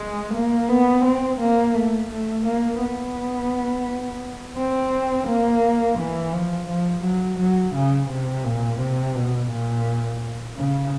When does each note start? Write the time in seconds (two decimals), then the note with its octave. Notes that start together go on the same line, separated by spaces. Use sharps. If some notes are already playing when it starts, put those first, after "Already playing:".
Already playing: G#3
0.34 A#3
0.69 B3
1.05 C4
1.40 A#3
1.75 A3
2.10 A3
2.46 A#3
2.81 B3
4.57 C4
5.28 A#3
5.99 E3
6.33 F3
6.68 F3
7.04 F#3
7.39 F#3
7.75 C#3
8.10 C3
8.45 A#2
8.80 C3
9.15 B2
9.51 A#2
10.57 C#3